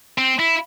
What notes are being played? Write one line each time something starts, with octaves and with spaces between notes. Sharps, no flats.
C4
E4